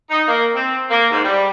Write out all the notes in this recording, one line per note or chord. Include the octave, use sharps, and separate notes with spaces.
D#4
A#3
C4
A#3
G#2
G3